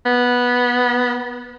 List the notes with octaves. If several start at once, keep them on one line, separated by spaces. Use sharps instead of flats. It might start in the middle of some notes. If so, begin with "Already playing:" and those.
B3